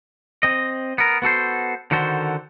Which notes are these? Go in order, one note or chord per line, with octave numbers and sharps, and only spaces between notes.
C4 D#5
B3 A#4
B3 F#4 A4 C5
D3 D#3 F#4 A4 C5